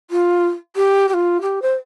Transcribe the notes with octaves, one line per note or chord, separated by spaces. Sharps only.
F4
G4
G4
F4
G4
C5